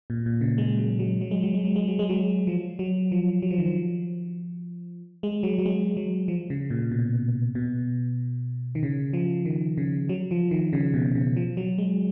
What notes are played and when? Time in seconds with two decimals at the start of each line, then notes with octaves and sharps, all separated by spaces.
0.10 A#2
0.26 A#2
0.41 C#3
0.58 G#3
0.78 F#3
0.99 F#3
1.21 F#3
1.31 G#3
1.43 F#3
1.54 G#3
1.65 F#3
1.76 G#3
1.88 F#3
1.99 G#3
2.09 F#3
2.47 F3
2.79 F#3
3.12 F3
3.42 F#3
3.51 F3
3.58 D#3
3.66 F3
5.23 G#3
5.43 F#3
5.58 F#3
5.66 G#3
5.97 F#3
6.28 F3
6.50 C#3
6.70 A#2
6.92 B2
7.55 B2
8.75 D#3
8.83 C#3
9.13 F3
9.45 D#3
9.78 C#3
10.09 F#3
10.31 F3
10.51 D#3
10.73 C#3
10.94 B2
11.15 C#3
11.37 F3
11.57 F#3
11.78 G#3